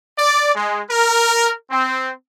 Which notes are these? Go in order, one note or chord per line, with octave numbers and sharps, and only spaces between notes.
D5
G#3
A#4
C4